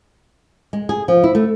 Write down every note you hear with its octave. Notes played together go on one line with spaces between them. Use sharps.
G#3
G#4
F3
E4
A3